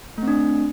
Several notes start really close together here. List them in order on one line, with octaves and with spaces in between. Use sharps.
A3 C4 D4